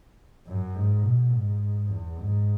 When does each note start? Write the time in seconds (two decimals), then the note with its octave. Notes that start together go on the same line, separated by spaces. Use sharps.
0.47 F#2
0.75 G#2
1.03 B2
1.32 G#2
1.90 E2
2.18 G#2